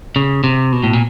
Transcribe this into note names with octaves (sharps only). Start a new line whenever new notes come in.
C#3
C3
B2
A2
A#2